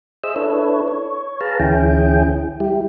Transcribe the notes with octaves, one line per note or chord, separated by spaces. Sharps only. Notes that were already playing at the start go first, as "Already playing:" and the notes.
G#4 C5 D#5 E5 E6
D4 E4 A4 B4 C#5
C#5
G#4 B4 F5 A5 A#5
D2 E3 C#4 E4 G#4 G5
G3 E4 G4